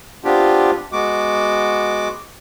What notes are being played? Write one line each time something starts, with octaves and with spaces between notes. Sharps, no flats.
B3 C4 D4 F4 G4
G#3 B3 F#4 D6